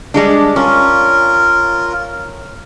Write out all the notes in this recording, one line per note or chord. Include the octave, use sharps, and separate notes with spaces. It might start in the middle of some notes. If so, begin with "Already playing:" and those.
G3 G#3 D4
C#4 F4 A#4